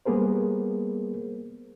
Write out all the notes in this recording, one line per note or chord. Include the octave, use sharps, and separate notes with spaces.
G3 A#3 B3 G#4 A#4 C5